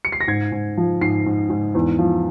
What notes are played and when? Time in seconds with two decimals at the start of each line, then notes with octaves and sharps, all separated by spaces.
0.05 C#7
0.12 C7
0.20 A#6
0.28 G#2 G#6
0.52 G#2
0.77 F3
1.01 G#2 C7
1.26 G#2
1.50 G#2
1.75 E2
1.99 F3